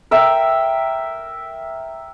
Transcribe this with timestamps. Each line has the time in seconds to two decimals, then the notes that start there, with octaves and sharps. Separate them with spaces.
0.11 A#4 E5 G5